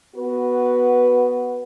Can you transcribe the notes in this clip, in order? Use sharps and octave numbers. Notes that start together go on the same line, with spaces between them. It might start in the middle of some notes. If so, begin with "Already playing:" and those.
B3 F#4 B4